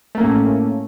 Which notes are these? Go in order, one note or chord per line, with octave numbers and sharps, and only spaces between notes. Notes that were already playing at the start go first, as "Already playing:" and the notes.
A2 A3 A#3 C#4